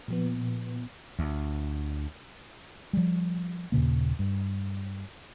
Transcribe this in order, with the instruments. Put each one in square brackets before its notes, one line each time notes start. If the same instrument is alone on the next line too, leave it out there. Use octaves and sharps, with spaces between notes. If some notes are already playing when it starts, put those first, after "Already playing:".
[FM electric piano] A#2 F3 B3
[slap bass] D2
[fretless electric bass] F3 G3
D#2 A#2 C#3 A#3
G2